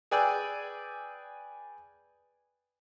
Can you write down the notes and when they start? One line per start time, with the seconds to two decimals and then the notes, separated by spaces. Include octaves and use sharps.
0.11 G#4 B4 D5 G5 G#5 E6